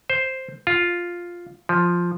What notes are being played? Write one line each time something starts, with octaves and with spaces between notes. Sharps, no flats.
C5
F4
F3